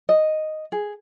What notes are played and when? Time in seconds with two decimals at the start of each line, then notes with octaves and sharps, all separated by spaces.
0.09 D#5
0.72 G#4